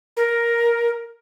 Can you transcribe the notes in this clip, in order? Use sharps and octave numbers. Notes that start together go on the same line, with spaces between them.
A#4